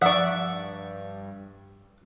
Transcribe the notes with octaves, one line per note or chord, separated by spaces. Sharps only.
G2 F3 D5 E5 F#5 C#6